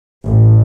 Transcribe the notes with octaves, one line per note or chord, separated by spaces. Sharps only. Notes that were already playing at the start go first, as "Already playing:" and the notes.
A1